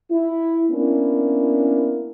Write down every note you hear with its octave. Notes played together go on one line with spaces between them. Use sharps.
E4
A#3 B3 C#4 D4 E4 A#4